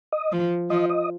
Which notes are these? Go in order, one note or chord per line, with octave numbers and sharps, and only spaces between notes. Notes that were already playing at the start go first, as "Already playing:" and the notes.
D#5
F3
F3 D#5
D#5